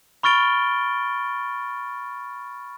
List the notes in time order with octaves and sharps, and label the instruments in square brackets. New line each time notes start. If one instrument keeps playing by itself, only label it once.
[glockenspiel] B5 C#6 F6 A6 D7 G7